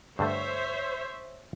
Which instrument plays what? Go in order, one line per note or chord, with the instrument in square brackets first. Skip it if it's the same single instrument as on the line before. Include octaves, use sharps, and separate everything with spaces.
[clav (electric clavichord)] G2 D3 A3 [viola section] C5 C#5 E5